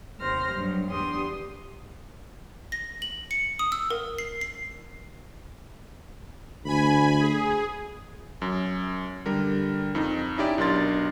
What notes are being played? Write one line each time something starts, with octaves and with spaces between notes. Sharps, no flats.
D#2 C3 C5 F6 A#6
G2 F#3
E2 B3 D4 G4 C6 D#6
A#6
F#7
C#7
D#6
E6
A#4
C7
C7
D2 G#5 B5
G#4
F#2
D3 G3 A#4
F2 D#4
C#4 D#4 E4 G4 D5
B1 D4 A#4 C6 A6